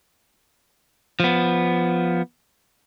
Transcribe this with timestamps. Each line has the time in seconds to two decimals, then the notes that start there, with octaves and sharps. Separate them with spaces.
1.20 F3 B3